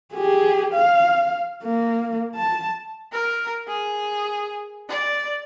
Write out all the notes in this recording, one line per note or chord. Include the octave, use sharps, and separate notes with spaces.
G4 G#4
F5
A#3
A5
A#4
G#4
D5